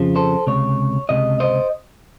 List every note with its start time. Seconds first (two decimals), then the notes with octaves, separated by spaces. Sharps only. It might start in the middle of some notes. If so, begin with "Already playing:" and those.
Already playing: F2 C#3 F3
0.16 A4 C5
0.47 C#2 C3 C#5
1.09 C#2 C3 D#5
1.40 C5 D#5